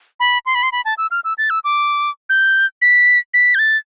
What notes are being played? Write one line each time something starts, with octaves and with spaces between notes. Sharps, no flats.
B5
C6
B5
C6
B5
A5
E6
F6
E6
A6
E6
D6
G6
B6
B6
G6
A6